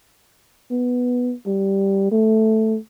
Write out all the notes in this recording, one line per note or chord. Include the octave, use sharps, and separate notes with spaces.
B3
G3
A3